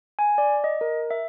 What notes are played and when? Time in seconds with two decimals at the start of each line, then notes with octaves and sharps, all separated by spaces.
0.19 G#5
0.38 D5
0.64 D#5
0.81 A#4
1.11 E5